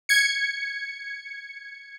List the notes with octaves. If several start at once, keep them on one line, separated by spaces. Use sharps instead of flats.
G#6 C#7